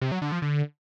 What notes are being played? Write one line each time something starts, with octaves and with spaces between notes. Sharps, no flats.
C3
F#3
D3
F3
D3